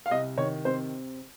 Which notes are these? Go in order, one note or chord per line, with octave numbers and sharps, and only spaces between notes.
F5
C2 D#5
D#3 C#5
C3 C5